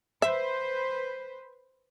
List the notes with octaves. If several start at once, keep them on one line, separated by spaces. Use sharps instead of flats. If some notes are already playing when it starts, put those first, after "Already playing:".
B4 C5 E5